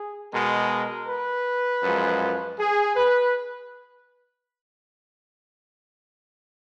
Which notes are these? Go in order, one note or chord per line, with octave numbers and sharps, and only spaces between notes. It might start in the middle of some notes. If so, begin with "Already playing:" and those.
Already playing: G#4
B2 G#3 A#4
B4
F#2 F3 G#3
G#4
B4